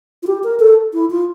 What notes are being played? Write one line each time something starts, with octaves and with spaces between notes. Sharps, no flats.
F4
G4
A#4
A4
E4
F4